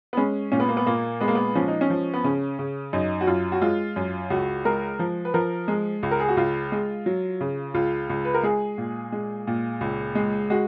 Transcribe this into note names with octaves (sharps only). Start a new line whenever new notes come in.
B3
G#3 C#4
A#2 C#4
B3
A#3
B3
A#2 A#3
G#3 B3
A#3
B3
F3 C#4
D#4
C#4
F3
B3
C#3 C#4
C#3
F#2 D#4
F#4
F#2 F4
F#4
G#3 F4
F#2
C#2 F#4
G#3 A#4
F3
B4
F3 A#4
G#3
C#2
A#4
G#4
F#4
C#2 F4
G#3
F#3
C#3
C#2 F4
C#2
B4
A#4
G#3 G#4
A#2
G#3
A#2
C#2
G#3
G#3 F#4